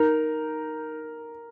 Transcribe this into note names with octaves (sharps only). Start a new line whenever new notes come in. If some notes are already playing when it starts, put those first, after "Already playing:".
Already playing: D#4 A#4